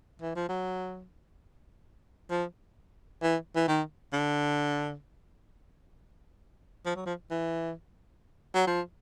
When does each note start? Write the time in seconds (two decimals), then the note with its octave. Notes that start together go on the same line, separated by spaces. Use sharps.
0.22 E3
0.36 F3
0.49 F#3
2.30 F3
3.22 E3
3.56 E3
3.68 D#3
4.13 D3
6.86 F3
6.96 F#3
7.06 F3
7.30 E3
8.54 F#3
8.67 F3